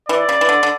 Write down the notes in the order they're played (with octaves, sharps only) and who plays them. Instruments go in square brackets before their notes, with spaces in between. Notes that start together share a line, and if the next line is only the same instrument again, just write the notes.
[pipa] E3 [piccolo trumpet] D5
[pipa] C#3
E3
D3
D3